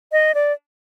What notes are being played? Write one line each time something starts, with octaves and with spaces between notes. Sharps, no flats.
D#5
D5